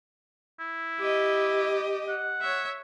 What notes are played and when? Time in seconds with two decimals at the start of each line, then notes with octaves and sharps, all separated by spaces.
0.60 E4
1.00 G4 D#5
2.09 F#5
2.41 C#5 E5